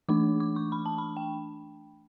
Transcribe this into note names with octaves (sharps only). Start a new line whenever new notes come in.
E3 A3 D4 D6
D6
C#6
B5
A5
B5
G5